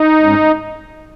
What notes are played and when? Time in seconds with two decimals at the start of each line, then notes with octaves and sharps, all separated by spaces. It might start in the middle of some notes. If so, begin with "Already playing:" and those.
Already playing: D#4
0.21 G#2 G#3 C#4